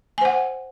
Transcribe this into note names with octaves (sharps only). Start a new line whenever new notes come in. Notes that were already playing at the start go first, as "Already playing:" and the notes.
C5 F#5 G#5